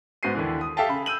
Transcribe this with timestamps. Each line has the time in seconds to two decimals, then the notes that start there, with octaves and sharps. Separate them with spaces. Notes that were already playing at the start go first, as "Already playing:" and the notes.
0.23 G#2 B3 F#4 C5 C7 D#7
0.35 D#2 D3 E3
0.61 D#6
0.77 G4 A4 E5 F5 G5 A5
0.89 C#3 B5
1.06 E6 G6 D#7 F#7